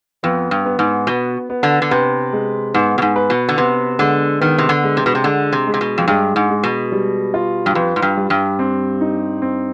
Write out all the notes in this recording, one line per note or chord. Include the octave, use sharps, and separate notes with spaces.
F2 B3
G2
B3
G#2
B2 B3
B3
D3
D3
C3 B4
G#3
G#2 B3
B2
G#2
B4
B2
D3
C3 B3
D3 G#3
D#3 B3
C3
D3
G#3
C3
B2
C3
D3 G#3
C3
G#3
C3
B2
F2
G2 G#3
G#2
G#3
B2
G3
F4
G2
F2 B4
G#2
G2
G3
G2
C4
D#4
C4